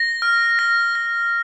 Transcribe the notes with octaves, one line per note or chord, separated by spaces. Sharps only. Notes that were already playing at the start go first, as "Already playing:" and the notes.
Already playing: A#6
F6
A#6
A#6